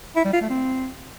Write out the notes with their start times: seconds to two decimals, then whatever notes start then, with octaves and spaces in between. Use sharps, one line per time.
0.16 E4
0.25 G3
0.33 F4
0.41 A3
0.50 C4